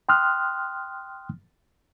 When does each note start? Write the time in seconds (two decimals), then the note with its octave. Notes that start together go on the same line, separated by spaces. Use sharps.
0.09 G5 C6 D#6 F6 F#6